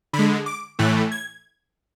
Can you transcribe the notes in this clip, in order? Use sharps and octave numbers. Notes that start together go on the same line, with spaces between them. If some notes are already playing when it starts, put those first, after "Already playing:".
D3 B5
G#3
D6
A2 E3 A3 F#6
G#6